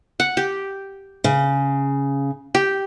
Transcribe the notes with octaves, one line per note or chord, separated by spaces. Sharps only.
F#5
G4
C#3
G4